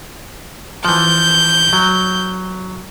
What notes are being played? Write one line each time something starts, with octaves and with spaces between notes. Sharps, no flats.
E3 F3 G6
F#3